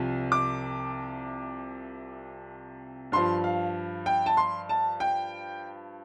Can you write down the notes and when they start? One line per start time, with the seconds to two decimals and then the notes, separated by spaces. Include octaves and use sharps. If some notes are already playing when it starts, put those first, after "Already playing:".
Already playing: C2 C3 F3
0.32 D6
3.12 G2 F3 C6
3.44 F5
4.06 G5
4.26 A5
4.37 C6
4.69 A5
5.00 G5